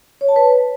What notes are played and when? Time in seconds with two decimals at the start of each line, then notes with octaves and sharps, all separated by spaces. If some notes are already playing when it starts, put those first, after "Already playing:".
0.21 C#5
0.29 A5
0.36 B4